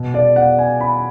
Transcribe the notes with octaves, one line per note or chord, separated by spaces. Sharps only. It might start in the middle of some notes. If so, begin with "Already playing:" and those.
Already playing: B2
D5
F#5
G#5
B5